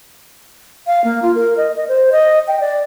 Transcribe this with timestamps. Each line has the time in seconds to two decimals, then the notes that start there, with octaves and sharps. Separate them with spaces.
0.87 F5
1.04 A#3
1.22 F4
1.35 A#4
1.57 D#5
1.76 D#5
1.88 C5
2.12 D#5
2.48 G5
2.60 D5